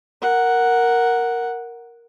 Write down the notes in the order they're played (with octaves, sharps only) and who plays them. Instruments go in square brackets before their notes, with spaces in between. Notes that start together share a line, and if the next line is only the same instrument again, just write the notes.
[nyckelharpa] A#4 F#5